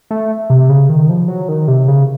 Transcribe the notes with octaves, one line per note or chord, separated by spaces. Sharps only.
A3
C3
C#3
D#3
F3
F#3
D#3
C3
C#3